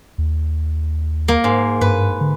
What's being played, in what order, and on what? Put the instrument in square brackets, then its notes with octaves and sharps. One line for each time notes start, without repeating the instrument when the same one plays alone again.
[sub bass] D#2
[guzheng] A#3
G#2
[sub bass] G2 [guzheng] B4
[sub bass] D3